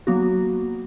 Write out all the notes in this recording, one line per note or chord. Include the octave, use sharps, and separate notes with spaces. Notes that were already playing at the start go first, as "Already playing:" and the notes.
F#3 A#3 B3 F#4